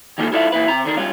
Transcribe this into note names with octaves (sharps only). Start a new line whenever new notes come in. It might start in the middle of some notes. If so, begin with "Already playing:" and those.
D#3 G3 A#3 F4 G#4 A4
E4 F4 A4 D5 E5 F5
A#2 E4 B4
C3 A#5
D3 D#3 D4 A#4
G2 G3 C#4 F4